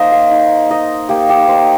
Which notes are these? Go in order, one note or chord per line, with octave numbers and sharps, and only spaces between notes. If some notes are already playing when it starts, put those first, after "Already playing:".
Already playing: A#3 D#4 C5 D#5
F5
D#4
D#4 D#5
A#3 G4
G4
D#4 C5